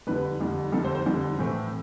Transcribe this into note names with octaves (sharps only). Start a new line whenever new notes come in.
F2 D3 G3 B4
F2 D3 G3
F2 D3 G3 A4
C5
C5
F2 D3 G3
A2 E3 A3 C4